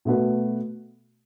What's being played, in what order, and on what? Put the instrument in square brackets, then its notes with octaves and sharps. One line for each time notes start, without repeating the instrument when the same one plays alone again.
[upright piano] B2 A3 F#4 B4